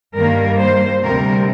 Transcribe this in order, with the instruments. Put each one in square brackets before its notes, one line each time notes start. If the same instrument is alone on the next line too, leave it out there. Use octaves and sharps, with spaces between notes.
[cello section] G2 D#3 G3 A#3 A#4
C5
D2 C3 G3 C4 A#4